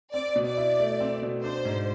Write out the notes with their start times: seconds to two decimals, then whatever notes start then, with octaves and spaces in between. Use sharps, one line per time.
0.13 C4 D5
0.36 B2
0.46 D5
0.57 E4
0.79 A3
1.01 C4
1.22 B2
1.44 D4 C5
1.65 G#2